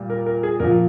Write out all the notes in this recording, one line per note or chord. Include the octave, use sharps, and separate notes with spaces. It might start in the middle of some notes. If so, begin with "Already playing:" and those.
Already playing: A#2 G3
A#4
A#4
G#4
A#2 F3 A#4